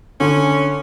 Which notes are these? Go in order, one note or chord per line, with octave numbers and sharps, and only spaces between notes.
D3 C#4